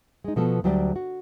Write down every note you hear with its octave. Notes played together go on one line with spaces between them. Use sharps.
G#3 D#4
B2 F3 B3 F#4 A4
D2 F#3 G3 G4 A4 D5
F#4